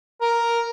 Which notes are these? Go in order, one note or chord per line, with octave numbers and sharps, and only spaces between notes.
A#4